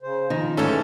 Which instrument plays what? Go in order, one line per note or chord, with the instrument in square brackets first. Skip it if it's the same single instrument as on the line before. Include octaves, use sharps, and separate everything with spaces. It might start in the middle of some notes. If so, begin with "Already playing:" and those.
[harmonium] C#3 C5
[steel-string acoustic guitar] D#3 [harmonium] F3
[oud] D2 G#2 [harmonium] E3 [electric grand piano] C#4 A4